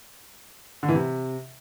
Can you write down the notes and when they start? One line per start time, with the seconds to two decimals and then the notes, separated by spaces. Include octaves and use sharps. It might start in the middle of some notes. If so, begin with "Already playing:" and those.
0.83 D3
0.89 E3
0.95 C3